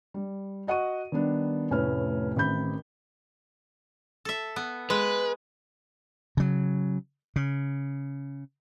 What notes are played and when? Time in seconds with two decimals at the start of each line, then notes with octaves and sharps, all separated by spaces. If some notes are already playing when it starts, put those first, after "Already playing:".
0.14 G3
0.67 F#4 D#5 F#5 C#6 D#7
1.12 D#3 G3 B3 D4
1.71 F1 A2 C#4 E4 B4 F6
2.36 A1 D#3 C4 B5 G6
4.25 A4 E5
4.56 B3
4.90 G#3 B4
6.37 C#3 F#3
7.36 C#3